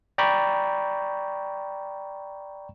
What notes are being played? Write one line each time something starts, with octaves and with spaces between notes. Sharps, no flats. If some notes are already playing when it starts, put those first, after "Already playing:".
D5 G5 A#5 B5 C#6